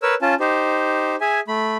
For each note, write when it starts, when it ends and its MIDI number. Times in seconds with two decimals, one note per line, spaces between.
0.02 0.15 70
0.02 0.15 71
0.02 0.15 73
0.02 0.15 88
0.22 0.35 61
0.22 0.35 65
0.22 0.35 81
0.40 1.16 63
0.40 1.16 67
0.40 1.16 72
1.21 1.40 68
1.21 1.40 76
1.21 1.40 80
1.48 1.77 57
1.48 1.77 83